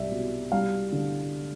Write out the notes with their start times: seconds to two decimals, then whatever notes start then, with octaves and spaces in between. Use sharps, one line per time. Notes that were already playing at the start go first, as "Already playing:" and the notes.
Already playing: C2 D5 E5
0.11 B2
0.52 G3 F5
0.92 D3